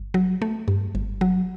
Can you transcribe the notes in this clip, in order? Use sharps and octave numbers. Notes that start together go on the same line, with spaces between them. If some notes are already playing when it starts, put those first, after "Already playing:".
Already playing: G1
F#3
A3
G2
G1
F#3